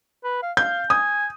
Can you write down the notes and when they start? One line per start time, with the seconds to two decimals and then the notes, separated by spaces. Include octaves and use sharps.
0.24 B4
0.43 F5
0.57 F5 G6
0.90 G#5 D#6